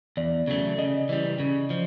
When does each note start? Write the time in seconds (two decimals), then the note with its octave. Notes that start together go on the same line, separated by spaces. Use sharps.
0.17 E2 D5
0.47 C#3 F#3 A3
0.78 C#3 D#5
1.09 E3 G3
1.40 C#3
1.70 F3